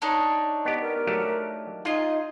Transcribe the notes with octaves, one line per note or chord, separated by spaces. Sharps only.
D4 D#4 C#5
B3 G4 D#5
A#4
F#3 A3 G4
D#4 F4 G#4 D#5